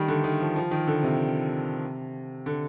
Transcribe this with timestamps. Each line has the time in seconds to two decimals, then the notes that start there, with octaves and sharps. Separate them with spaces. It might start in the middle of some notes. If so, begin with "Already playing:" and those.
Already playing: D#3 G3 A3
0.08 D3
0.24 D#3
0.41 F3
0.56 F3
0.71 D#3
0.87 D3
1.03 C3
2.46 D3